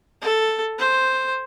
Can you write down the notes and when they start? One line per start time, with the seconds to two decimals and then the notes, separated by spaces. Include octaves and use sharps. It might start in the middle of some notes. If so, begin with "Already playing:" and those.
0.22 A4
0.79 C5